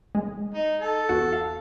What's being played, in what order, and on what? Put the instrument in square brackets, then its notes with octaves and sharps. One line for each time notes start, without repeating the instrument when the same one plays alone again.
[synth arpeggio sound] G#3
[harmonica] D#4
A4
[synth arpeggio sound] E2 F#4 F#5
F5